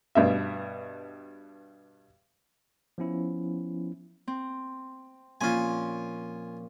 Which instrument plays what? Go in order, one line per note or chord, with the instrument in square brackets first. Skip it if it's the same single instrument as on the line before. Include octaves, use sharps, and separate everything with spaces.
[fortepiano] G2 B2 E5
[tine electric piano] F3 B3 C#4 E4
[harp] C4
[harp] A#2 F3 C#4 [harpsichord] F4 G#5